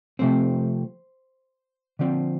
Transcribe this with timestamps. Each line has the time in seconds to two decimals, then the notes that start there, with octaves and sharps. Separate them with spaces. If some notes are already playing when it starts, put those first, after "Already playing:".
0.19 C3 F3 A3 C4 C5
1.99 D3 F3 C4